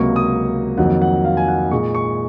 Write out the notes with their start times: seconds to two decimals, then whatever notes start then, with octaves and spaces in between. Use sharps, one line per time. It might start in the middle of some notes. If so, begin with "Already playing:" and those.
Already playing: C#2 C3 F#3 A#3 C#6
0.16 D#6
0.78 F2 D#3 F#3 A#3 F#5
1.02 F#5
1.25 F5
1.37 G#5
1.48 F#5
1.71 A#2 G#3 C#6
1.95 C#6